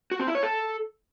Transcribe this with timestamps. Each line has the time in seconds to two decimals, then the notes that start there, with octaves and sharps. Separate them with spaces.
0.11 F#4
0.19 C4
0.27 E4
0.35 C#5
0.43 A4